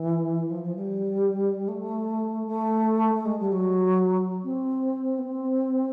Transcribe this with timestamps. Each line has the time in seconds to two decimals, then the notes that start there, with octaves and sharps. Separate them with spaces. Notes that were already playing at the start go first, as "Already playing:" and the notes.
Already playing: E3
0.49 F3
0.63 F3
0.76 G3
1.68 A3
2.47 A3
3.14 A3
3.25 G#3
3.39 G3
3.52 F#3
4.44 C4
5.18 B3
5.23 C4